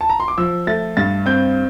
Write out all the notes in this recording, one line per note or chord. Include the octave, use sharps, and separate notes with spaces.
A5
A#5
C6
D6
F3 E6
A3 A6
G2 A6
C4 G6